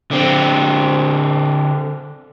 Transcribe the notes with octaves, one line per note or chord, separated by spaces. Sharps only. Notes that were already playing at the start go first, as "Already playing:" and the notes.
D3 C4